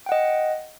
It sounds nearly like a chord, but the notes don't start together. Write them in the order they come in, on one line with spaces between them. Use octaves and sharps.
G5 F#5 D#5